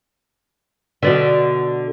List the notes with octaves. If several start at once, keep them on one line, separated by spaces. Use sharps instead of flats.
B2 D3 B3 D5 E5